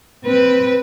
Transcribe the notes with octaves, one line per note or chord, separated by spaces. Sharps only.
C4 B4